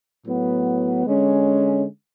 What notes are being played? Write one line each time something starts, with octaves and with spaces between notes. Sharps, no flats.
A2 F#3 B3
D3 G#3 C#4